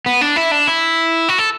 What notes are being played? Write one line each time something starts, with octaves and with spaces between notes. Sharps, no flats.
B3
D4
E4
D4
E4
F#4
A4